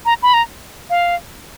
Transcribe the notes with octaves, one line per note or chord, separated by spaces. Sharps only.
A#5
B5
A#5
F5